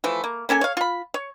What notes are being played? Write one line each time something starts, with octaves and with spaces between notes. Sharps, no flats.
E3 F3 A3
A#3
A#3 C#4 A4 G#5
C#5 F5
F4 B5
C#5